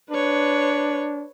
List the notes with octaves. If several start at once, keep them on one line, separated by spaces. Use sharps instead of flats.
D4 B4 C#5